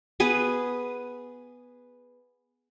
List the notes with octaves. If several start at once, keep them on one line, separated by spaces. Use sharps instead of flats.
B3 G#4 B4